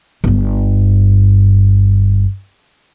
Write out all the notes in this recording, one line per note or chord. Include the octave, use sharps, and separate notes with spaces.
G1 G2